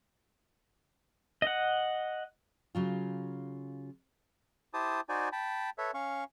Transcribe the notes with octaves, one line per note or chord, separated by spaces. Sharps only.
D#5 F#5
C#3 F#3 F4
E4 G4 C5 A5 D#6
D#4 F#4 C5 D5 G#5
G5 A5 B5
A4 B4 C#5 E5
C#4 F5 C#6